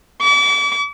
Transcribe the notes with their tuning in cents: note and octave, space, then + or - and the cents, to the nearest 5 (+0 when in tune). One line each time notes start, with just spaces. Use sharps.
D6 -40